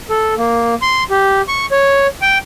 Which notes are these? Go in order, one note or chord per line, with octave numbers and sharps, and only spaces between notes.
A4
A#3
C6
G4
C#6
C#5
G5